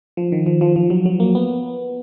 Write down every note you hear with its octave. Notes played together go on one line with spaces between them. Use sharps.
F3
D#3
F3
F3
F3
F#3
F#3
A#3
B3